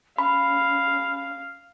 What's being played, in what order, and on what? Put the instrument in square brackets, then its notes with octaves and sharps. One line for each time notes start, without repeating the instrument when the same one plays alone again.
[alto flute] C#4 [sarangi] F5 [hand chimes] B5